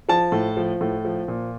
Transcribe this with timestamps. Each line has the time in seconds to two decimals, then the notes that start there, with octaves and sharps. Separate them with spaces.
0.09 F3 A5
0.32 A2
0.57 F3
0.81 A2
1.05 F3
1.28 A#2